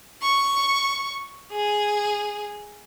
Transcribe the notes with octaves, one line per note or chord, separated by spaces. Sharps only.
C#6
G#4